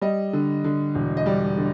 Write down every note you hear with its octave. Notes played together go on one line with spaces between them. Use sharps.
G3 D#5
D3
D3
E1
D#5
G3 D5
D3